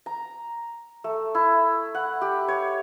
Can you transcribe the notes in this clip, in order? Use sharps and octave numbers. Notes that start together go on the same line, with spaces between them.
A#5
A3
E4
F#5
G4
C#5